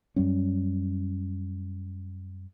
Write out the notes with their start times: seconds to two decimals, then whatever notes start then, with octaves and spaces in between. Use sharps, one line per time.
0.16 F#2 F#3 G3 C#4